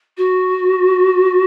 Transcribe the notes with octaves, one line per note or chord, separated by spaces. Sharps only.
F#4